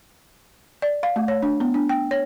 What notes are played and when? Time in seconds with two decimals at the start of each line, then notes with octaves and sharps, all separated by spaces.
0.82 D5
1.03 F5
1.16 A3
1.28 C#5
1.42 D4
1.60 B3
1.74 D4
1.89 G5
2.11 C#5